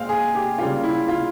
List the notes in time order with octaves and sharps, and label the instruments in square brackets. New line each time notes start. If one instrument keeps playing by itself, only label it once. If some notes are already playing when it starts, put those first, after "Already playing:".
Already playing: [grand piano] A#2 G#3 C4 F5
G#4
G4
C#3 G3 A#3 F4
E4
F4